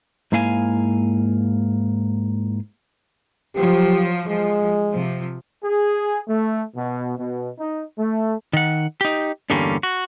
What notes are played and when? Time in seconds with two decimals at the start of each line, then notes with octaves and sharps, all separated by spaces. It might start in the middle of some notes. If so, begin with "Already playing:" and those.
0.32 G#2 A#3 E4 F5 G#5
3.56 F3 F#3 G4
4.27 F3 G#3
4.91 C3 F3
5.63 G#4
6.28 A3
6.75 B2
7.17 B2
7.58 D#4
7.97 A3
8.53 D#3 F#5
9.01 D#4 G4
9.50 E2 G2 D3 G3 A#3 C#4
9.83 F#4